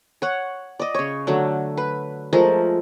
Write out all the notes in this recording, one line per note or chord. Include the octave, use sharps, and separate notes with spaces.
C#5 F#5
D5 D#5
C#3 C#5
D3 F#3 A3
B4
F3 G#3 A3 A#4